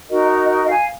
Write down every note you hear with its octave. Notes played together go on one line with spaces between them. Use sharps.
D#4 F#4 A#4 D#5
D#5
D#5
F5 G#5